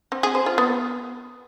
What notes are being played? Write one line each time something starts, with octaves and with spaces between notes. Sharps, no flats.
C4
G#4
C5
F4
B3